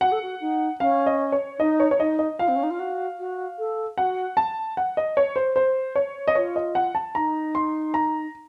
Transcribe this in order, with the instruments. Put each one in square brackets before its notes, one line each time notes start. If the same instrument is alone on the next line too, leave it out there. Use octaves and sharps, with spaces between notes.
[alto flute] F#4 [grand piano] F#5
[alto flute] A4
F#4
D#4
[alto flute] C#4 [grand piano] F5
[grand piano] D#5
C#5
[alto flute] D#4 [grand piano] D#5
[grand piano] C#5
C#5
[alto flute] D#4 [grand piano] D#5
[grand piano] D#5
[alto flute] F4 [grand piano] F5
[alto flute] C4
C#4
D#4
F4
F#4
F#4
A4
[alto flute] F#4 [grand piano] F#5
[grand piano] A5
F#5
D#5
C#5
C5
C5
C#5
D#5
[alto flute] F4 [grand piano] C#5
[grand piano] D#5
F#5
A5
[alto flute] D#4 [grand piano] A#5
[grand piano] C6
A#5